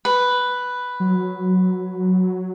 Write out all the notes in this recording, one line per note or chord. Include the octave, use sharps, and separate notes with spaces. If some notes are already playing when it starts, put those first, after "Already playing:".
B4
F#3